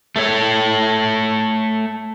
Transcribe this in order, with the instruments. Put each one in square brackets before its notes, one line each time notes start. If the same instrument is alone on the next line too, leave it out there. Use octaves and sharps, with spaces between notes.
[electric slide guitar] A3 A4 C#5